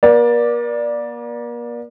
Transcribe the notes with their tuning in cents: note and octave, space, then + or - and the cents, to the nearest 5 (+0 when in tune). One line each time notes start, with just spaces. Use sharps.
A#3 +40 D5 +0